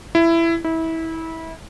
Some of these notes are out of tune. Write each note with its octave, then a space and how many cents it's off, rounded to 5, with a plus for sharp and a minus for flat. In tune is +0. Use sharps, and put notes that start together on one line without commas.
E4 +15
E4 -25